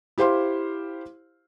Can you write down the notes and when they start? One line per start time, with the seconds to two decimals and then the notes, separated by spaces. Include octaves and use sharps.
0.18 E4 G4 C5 F5 C6